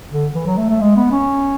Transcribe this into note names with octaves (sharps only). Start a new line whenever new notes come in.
D3
E3
F#3
A3
A3
G#3
B3
C#4